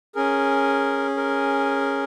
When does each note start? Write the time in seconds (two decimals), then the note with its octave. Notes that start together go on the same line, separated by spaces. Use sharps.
0.15 C#4 G#4 A#4
1.17 A#4